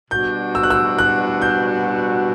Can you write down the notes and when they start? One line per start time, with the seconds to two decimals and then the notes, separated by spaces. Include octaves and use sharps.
0.11 B2 G3 D4 F#4 G6
0.55 E6
0.63 F#6
0.70 E6
0.99 F#6
1.42 G6